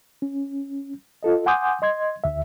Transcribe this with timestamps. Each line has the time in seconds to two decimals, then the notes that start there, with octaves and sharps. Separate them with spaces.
0.22 C#4
1.23 F4 A4 D#5
1.46 F#5 G#5 C6 D6 D#6 G6
1.82 D#5 C6 G#6
2.24 D2 E5